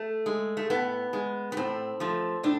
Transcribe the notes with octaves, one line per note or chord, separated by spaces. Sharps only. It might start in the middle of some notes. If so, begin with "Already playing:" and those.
Already playing: A3
G#3
A3
A2 B3
G#3
B3
A2 C4
F3 A3
A2 D4